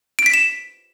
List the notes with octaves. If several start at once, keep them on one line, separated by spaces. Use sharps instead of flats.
D7
B6
E7